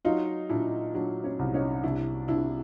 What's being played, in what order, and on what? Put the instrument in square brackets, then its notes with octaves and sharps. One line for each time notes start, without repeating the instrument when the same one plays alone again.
[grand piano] F#3 [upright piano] D#4 F4
[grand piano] A#2 [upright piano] D4 E4
[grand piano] F#3 [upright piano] D4
[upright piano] C#4
[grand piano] C2
[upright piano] C#4 D#4
[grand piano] C2 [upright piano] D4 E4
[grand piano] C3 [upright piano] D4 E4